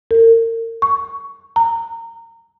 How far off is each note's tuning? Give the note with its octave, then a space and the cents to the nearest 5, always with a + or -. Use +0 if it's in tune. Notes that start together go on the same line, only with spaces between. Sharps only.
A#4 -35
C#6 +15
A#5 -20